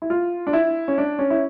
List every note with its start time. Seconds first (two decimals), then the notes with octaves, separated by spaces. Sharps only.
0.02 E4
0.10 F4
0.47 D4
0.53 E4
0.88 C#4
0.98 D4
1.19 C#4
1.30 E4